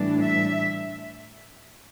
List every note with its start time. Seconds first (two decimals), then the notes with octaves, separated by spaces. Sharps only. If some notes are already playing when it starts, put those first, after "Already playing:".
Already playing: A2 E3 G3 D4
0.21 E5